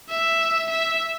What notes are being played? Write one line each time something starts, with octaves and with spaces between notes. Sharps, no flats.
E5
E5